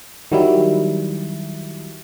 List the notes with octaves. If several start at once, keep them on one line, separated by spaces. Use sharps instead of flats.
D#3 F#3 G3 E4